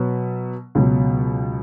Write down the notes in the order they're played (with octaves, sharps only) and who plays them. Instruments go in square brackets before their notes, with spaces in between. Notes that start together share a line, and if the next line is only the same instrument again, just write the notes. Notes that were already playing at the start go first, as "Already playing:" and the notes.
Already playing: [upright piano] B2 F#3 B3
C#2 B2 F#3